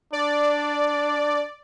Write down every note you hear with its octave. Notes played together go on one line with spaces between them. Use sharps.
D4 D5